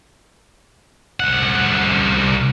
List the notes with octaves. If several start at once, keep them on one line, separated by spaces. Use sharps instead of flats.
C2 F#5